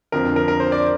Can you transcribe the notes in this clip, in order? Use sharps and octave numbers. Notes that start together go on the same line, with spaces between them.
F2 D3 F3 A#4
A#4
A#4
C5
D5